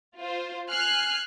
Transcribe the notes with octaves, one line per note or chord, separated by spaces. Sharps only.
F4 C5
G#5 F6 F#6 C7